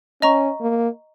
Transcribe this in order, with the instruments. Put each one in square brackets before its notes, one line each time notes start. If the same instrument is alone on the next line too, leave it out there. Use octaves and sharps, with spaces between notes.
[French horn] C#4 [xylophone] D#5 A#5 C#6
[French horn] A#3